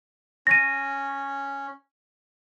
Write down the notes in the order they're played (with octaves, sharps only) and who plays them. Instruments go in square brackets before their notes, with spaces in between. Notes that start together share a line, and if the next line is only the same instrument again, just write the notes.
[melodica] C#4 [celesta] A#6 D#7